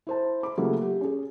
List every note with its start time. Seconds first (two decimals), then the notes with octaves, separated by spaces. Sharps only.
0.07 E4 C5 A5
0.43 B5 D6
0.57 C#3 F#3 A3 A#3 F4 G4
0.81 G4
1.01 C#4 G#4